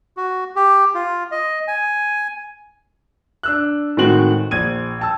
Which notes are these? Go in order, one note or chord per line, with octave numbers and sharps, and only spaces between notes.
F#4
G4
F4
D#5
G#5
D4 E6 F#6
A2 D#3 G#3 C4 F#4 F#7
A#1 G#6 D#7
G5 A5 E6